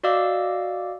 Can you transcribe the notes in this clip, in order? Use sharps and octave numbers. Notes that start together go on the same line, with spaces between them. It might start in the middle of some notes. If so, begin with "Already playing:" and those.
F#4 D5 D#5 F5 D6 E6